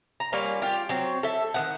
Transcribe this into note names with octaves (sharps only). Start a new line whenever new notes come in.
A#5
G3 A#3 C#4 F4
F4 G4
F#3 C4
A4 E5
D#3 B3 F#5